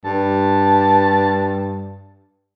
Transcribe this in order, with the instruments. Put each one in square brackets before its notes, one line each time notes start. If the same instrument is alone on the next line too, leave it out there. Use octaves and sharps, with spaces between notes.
[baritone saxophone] G2 [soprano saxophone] A5